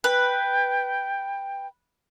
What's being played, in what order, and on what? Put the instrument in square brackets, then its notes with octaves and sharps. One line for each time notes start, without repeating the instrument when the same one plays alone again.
[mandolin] B4 [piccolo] G5